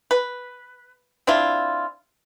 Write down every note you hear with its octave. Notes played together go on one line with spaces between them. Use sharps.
B4
C4 D4 E4 F4